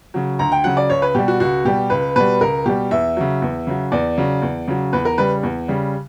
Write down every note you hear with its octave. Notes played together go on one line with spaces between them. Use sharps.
C#3 F#3
D2 A#5
G5
C#3 F#3 F#5
D5
C#2 C#5
B4
B2 G3 G4
F#4
C#2 F#4
B2 G3 G4
C#2 B4
B2 G3 B4
C#2 A#4
B2 G3 G4
E2 E5
C#3 F#3
E2
C#3 F#3
E2 D5
C#3 F#3
E2
C#3 F#3
E2 B4
A#4
C#3 G3 B4
E2
C#3 G3